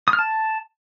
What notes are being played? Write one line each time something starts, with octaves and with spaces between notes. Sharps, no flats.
D#6
F6
A5